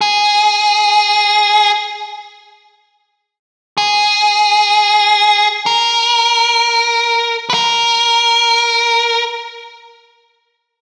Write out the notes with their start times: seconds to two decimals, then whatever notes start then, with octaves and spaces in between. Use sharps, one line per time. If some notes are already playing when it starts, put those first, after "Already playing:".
0.01 G#4
3.78 G#4
5.66 A#4
7.50 B4
7.54 A#4